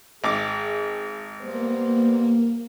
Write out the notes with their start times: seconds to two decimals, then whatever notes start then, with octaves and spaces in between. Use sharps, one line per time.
0.24 G#1 G#4 D6
1.42 G3 A#3 B3 C5